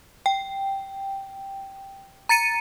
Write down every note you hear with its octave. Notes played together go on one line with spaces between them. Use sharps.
G5
A#5 A6 C#7 D#7